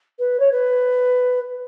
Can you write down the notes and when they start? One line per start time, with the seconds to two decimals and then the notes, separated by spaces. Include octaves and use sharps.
0.19 B4
0.39 C#5
0.52 B4